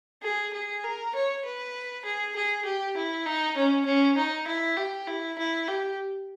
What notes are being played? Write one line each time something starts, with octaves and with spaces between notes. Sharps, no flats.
G#4
G#4
A#4
C#5
B4
G#4
G#4
G4
E4
D#4
C#4
C#4
D#4
E4
G4
E4
E4
G4